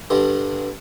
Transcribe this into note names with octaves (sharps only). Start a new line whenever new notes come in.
G2 D3 G3